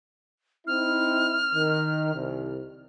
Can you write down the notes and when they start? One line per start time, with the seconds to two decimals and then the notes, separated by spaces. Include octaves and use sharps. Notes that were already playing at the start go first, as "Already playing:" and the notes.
0.67 C4 D#4 E4 F6
1.55 D#3
2.14 C2 C3